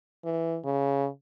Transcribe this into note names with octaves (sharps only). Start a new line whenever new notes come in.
E3
C#3